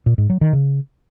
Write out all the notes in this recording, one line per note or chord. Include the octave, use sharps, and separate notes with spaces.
A#2
G#2
F#3
D#3
C#3